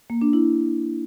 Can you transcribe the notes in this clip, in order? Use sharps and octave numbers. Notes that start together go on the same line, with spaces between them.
A#3
D4
E4